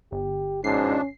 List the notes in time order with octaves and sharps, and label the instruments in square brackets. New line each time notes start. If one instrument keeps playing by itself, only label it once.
[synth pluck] G1 [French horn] G4
[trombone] G#2 [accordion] B2 F3 D4 [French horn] C#4 [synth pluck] C7